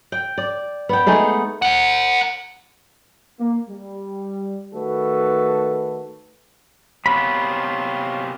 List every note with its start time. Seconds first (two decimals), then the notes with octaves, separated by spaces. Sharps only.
0.12 G5
0.38 D5
0.89 B3 G5
1.06 G#3 A3 D#4 G#4
1.62 A#4 F#5
3.39 A#3
3.69 G3
4.74 D#3 A3 F#4 A4 B4
7.06 C3 A#3 B3 C#5 F5 B5 C6